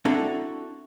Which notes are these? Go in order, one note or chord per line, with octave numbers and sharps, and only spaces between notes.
C4 D4 E4 F#4 A4 A#5